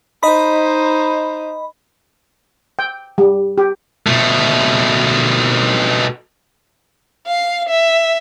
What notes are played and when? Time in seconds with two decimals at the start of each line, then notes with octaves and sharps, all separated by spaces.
0.23 D#4 C5 D#5 B5
2.79 G5
3.18 G3
3.58 G4
4.07 B2 A3
7.27 F5
7.69 E5